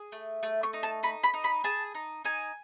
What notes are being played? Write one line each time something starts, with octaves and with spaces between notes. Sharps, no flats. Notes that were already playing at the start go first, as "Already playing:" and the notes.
Already playing: G#4
A3
A3
C#6
D#4
A5
D#4 B5
B5
D#4
B5
G#4 A5
D#4
D#4 G#5